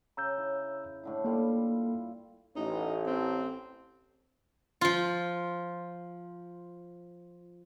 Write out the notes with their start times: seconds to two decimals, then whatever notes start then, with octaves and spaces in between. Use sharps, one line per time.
0.17 C#3 A#5 E6 G6
0.38 E4
1.03 A2 D3 E4
1.24 G3 A#3 E4 F4 A4
2.56 A1 D#4
3.06 C4
4.81 F3 F4